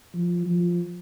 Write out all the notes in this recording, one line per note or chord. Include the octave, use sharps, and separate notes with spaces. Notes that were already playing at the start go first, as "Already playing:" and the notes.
F3
F3